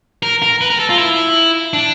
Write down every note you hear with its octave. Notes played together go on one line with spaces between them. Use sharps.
A#4
A#4
B4
A#4
A4
F4
E4
D4